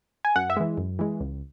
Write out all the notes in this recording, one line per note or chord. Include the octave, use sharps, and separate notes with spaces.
G#5
F#2 F#5
E5
E3 G#3
F#2
E3 G#3
C#2